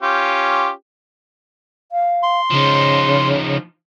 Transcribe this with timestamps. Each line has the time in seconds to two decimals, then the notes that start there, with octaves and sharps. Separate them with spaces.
0.03 C#4 F4 G4
1.92 F5
2.23 C6
2.51 C#3 F3 D#4